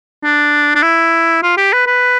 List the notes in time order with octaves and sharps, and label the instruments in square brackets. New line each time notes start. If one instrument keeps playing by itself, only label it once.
[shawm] D4
D4
E4
F4
G4
B4
B4